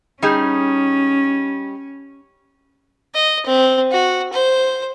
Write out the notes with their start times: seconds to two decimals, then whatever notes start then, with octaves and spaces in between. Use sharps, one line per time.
0.22 G3 C#4 D#4 G#4
3.15 D#5
3.46 C4
3.92 F#4
4.33 C5